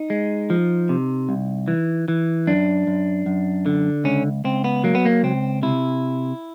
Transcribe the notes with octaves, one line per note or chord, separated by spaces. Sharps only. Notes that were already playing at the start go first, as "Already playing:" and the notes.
Already playing: D#4
G#3
F3
C3
C2
E3
E3
F#2 D4
F#2
F#2
D3
C#2 C#4
C#2 C4
B3
F#3 A#3
B3
A#3
C#2 C4
C3 E4